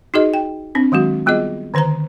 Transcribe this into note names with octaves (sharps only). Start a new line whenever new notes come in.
D#4 F#4 G#4 D#5
G5
C4 D4
D#3 F#3 G#3 F#4
G3 B3 F4 G#4 D#5
D3 D#3 B4 C5 A#5